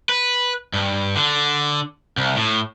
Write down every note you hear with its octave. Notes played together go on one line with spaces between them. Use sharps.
B4
G2
D3
C2
A2